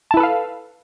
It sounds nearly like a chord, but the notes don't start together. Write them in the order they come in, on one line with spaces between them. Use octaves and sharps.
A5 E4 B4 A4 F5